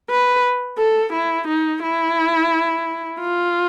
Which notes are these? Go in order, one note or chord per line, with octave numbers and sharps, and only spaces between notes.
B4
A4
E4
D#4
E4
F4